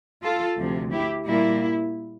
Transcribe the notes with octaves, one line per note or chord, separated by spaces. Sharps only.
F4 A4
D2 C3 F3
E4 G4
A#2 G3 A#3 E4